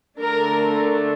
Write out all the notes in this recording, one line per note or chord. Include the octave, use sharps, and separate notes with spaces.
D3 A3 D4 A#4